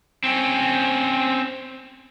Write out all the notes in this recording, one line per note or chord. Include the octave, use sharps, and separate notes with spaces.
C4 C#4